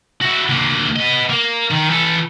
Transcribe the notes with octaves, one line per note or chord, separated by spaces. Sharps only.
E4 F#4
D2 A#3
B3 D#5
A#3
D#3
E3 A4